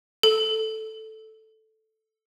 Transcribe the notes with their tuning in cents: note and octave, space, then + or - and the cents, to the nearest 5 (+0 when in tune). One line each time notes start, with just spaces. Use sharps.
A4 -5